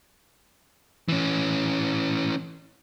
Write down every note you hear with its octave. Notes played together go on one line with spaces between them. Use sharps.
E3 C#4